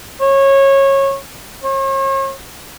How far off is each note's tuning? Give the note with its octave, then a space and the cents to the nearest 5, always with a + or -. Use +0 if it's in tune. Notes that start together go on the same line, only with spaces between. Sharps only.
C#5 -20
C#5 -40